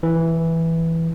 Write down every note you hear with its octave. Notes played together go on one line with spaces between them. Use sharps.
E3